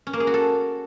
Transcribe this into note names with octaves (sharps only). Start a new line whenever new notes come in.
C#4
A#3
G#4
F#4
A4